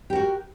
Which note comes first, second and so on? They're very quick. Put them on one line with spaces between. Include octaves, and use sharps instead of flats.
G4 A#4 F#4